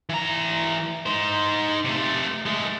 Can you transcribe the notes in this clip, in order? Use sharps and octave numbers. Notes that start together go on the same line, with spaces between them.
E3 A#5
D#4 C5
C3 A3
G#3 A3